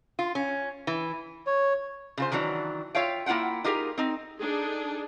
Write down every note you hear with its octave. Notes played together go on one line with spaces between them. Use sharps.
F4
C#4
E3
C#5
C#3 F4 C5
D#3 E3 F#3 D4
F4 C#5 E5 F5 G5
A#3 E4 F4 F#5 G5
D#4 F4 G4 G#4 A#4
C4 D#4
D4 D#4 G#4 A4